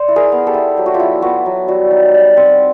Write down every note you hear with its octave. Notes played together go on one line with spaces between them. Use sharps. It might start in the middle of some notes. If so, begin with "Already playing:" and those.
Already playing: C5 D5
E4
G#4 A#4
B3
G4 A4
E4
F#3 G4
F#4
F4 G4
E4
B3 F#4
F#3
G3 F#4
D#4
G3
C4